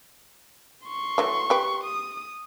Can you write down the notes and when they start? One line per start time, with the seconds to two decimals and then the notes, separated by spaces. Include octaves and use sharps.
0.87 C6 C#6
1.18 E3 F#3 A3
1.50 G4 B4
1.84 D#6